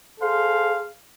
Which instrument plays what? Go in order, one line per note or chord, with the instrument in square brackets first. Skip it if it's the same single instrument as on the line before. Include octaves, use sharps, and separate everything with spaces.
[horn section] G#4 A4 C5 F5